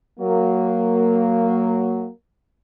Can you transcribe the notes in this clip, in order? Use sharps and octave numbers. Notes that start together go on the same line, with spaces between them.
F#3 A#3